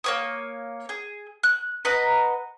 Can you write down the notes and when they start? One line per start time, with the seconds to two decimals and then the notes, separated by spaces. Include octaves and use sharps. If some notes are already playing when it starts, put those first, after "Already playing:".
0.04 A#3 C#5 D#6
0.89 G#4
1.43 F#6
1.85 B4 D#5 F#5 A#5